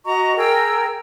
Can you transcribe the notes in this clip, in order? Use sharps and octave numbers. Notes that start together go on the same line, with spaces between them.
F#4 D#5 A#5 C#6
G#4 A#4 G5 E6